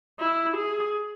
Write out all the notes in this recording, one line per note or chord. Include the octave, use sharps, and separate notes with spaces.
E4
G#4